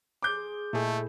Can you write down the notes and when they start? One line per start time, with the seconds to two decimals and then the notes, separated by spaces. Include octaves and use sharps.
0.22 G#4 C5 D6 G6
0.73 A#2 A3 E4 G#4 A4 D#5